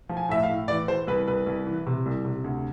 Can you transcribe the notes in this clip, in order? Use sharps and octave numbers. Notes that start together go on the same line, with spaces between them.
F3
G#5
A2 E5
F5
A2
E3 D5
E3 C5
C2 B4
C2 B4
C2
E3
C3
C2
C3
D2